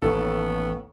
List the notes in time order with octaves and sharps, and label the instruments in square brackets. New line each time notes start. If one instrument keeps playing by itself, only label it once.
[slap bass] A1 [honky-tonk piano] D#2 A3 [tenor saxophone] B3 [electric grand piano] A4